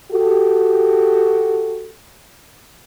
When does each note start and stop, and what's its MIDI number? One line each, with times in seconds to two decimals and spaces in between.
0.12 1.89 66
0.12 1.89 67
0.12 1.89 69